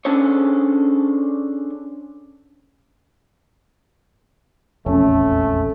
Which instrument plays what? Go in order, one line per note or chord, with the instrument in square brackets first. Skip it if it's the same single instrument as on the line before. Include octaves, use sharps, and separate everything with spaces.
[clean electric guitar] C#4 D4 G#4 A4 C5 C#5
[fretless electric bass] E1 A#1 F2 [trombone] A3 [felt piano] C#4